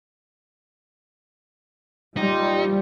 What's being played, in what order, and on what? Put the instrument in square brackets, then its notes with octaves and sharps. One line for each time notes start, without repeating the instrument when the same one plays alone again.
[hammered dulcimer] A#2 G4 C5 [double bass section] G3 [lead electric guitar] D#4